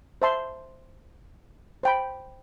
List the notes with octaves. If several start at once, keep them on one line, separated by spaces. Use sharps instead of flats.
C5 E5 A5 C6
C5 G5 B5